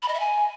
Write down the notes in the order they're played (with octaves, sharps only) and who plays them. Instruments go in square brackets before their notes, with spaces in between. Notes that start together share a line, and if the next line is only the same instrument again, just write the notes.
[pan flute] B5
D#5
E5
G#5